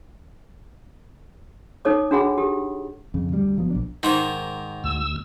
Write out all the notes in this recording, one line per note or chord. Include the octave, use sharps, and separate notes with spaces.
D#4 A4 C#5 D6
D4 F#4 G#4 F#5 B5
G4 A4
F2 C#3
D2 G3
F#1 F3 F#3 B3
A#1 D4
G#2 D#3 A#4 C5
D2 E6